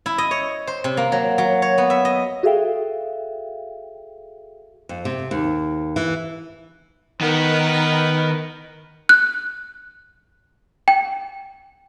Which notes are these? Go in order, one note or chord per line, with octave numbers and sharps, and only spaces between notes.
E4
D#5
C#5
C5
C3
A#3
F#3
F#3
C#5
B3
E5
D#5
F#4 G#4 A4 E5 F5 G5
F2
C3
D#2
E3
D#3 B3 A#4 B4
F#6
G5